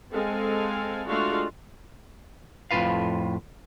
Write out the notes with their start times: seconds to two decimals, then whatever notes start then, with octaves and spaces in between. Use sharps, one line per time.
0.12 G#3 C4 A4 F5 G#5
1.07 G#3 A3 D4 F4 F#4 F5
2.71 F2 A2 C3 F4 B4 F5